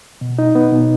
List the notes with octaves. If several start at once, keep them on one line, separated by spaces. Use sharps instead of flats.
B2
D#4
B3
B2